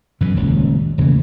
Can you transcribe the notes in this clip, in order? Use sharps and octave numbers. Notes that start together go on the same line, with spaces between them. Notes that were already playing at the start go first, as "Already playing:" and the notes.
F#2 B2 D3 E3
D#1 C#2
D#1 C#3 E3 A3